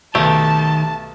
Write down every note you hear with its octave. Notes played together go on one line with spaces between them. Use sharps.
B1 D#3 A3 G4 A5